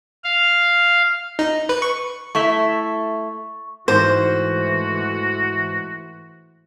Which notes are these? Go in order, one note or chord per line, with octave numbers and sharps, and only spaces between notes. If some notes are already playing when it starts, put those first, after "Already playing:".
F5
D#4
B4
C#6
A3 E4 E5 C#6
G#2 E3 A3 F#4 C5